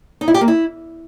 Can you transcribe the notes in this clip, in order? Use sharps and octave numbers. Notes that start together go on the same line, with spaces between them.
D#4
E4
G4
A#3
E4